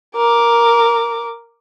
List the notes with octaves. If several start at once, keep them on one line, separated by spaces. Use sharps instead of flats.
A#4 D6